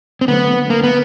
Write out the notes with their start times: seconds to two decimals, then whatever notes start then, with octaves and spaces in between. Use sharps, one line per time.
0.21 C4
0.28 D3 F#3 A3 B3
0.70 A#3
0.84 B3